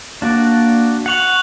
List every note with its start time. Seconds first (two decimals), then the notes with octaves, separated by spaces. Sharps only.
0.22 A#3 D4 F#4 D5
1.06 F#5 C#6 F#6 F7 F#7